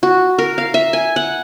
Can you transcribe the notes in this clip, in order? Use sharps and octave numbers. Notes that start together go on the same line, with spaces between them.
F#4
A#4
F5
E5
G#5
F#5